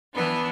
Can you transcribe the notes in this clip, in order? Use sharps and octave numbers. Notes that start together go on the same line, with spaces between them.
E3 B3 D4